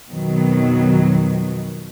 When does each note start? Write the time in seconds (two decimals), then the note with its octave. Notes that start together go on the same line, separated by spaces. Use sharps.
0.11 F2 B2 D#3 F#3